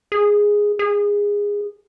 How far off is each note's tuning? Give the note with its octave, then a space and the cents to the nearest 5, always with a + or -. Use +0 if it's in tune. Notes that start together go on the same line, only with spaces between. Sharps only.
G#4 -5
G#4 -20